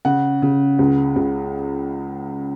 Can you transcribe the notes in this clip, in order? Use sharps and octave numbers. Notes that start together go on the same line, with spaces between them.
C#3 F#5
C#3
C#2
C#2